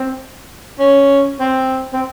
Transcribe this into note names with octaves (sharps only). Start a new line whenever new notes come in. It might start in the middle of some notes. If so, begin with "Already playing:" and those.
Already playing: C4
C#4
C4
C4